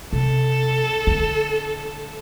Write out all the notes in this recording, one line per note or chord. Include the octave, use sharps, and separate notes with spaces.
C3 A4
D3